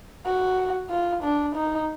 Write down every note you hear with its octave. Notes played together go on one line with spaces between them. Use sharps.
F#4
F4
D4
D#4